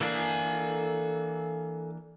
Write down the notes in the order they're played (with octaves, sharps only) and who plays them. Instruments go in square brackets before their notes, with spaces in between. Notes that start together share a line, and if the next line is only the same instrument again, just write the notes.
[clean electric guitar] E3 A#3 D4 [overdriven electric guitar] A4 G#5